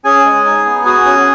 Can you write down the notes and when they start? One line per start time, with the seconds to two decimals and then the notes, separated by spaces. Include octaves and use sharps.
0.04 C#4 G#4 G#5
0.25 G#3
0.45 D#4
0.65 B3
0.85 F#4 G#4 G#5
1.05 C#4